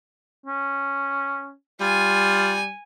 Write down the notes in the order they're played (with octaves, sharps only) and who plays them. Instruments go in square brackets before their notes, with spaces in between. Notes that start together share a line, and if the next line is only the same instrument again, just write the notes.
[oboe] C#4
[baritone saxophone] G3 [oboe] F4 [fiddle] G#5